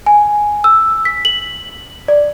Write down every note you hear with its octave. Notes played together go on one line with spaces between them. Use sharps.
G#5
E6
B6
F#7
D5